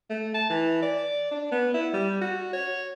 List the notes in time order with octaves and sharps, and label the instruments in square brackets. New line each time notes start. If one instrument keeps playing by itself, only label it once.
[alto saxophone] A3
A5
E3
D5
D4
B3
E4
G3
F#4
C#5